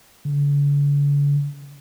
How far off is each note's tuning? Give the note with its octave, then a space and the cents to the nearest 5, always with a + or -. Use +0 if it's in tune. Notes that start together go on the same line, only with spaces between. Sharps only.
D3 -45